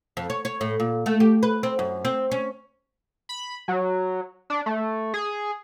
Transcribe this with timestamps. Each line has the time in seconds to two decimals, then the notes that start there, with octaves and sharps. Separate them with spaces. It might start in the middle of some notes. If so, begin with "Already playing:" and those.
0.17 F2
0.30 C#5
0.45 C#5
0.61 A2
0.80 A#2
1.06 A3
1.20 G4
1.43 B4
1.63 C4
1.79 F#2
2.05 C4
2.31 C#4
3.29 B5
3.68 F#3
4.50 D4
4.66 A3
5.14 G#4